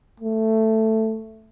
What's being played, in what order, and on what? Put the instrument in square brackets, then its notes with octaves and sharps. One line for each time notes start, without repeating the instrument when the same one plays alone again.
[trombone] A3